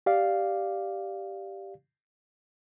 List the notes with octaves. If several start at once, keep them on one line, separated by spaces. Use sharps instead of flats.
G4 D5 F5